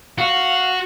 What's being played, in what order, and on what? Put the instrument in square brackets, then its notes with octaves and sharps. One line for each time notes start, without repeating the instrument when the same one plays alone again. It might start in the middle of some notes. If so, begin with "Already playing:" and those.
[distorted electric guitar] F#4 [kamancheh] F5